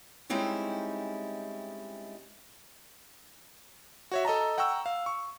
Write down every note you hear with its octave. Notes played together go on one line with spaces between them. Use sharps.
G3 G#3 C4 C#4 D#4 E4
F#4 C#5 E5
A4 D#5 A5 A#5
F#5 G5 A#5 C#6 E6
F5
C#6